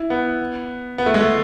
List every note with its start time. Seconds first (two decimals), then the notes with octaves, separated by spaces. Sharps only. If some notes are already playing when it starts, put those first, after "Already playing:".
Already playing: E4
0.10 B3
0.98 B3
1.06 A3
1.14 G#3
1.21 A3